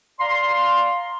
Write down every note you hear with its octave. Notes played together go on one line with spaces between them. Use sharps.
D5 F5 A#5 C6